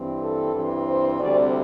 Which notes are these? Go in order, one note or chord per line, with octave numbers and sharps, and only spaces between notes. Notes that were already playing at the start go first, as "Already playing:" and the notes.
Already playing: G2 E3 C4
A4
G2 E3 C4
C5
D2 C3 G3 C4 D5